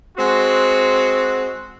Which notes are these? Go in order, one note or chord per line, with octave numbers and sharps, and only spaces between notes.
G#3 C4 F#4